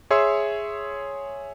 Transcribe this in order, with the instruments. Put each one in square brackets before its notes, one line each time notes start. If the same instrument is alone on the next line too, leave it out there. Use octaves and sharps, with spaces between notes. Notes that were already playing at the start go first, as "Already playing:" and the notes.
[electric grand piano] G#4 C#5 E5 C6 E6